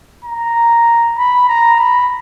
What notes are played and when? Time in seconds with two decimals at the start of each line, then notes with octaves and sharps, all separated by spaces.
0.25 A#5
1.18 B5
1.49 A#5
1.79 B5